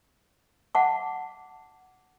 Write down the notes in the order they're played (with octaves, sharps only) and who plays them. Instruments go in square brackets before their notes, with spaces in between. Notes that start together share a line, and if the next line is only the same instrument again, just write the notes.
[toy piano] F5 F#5 A5 D6